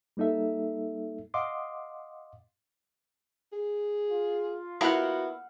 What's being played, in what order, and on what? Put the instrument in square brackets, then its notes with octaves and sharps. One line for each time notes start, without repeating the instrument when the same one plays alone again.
[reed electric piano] G3 A#3 D#4 A4 E5
D#5 F5 F#5 C6 D6 D#6
[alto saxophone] G#4
[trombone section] F4
[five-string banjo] B3 E4 A#4 [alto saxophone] F#4 [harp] F5 F#5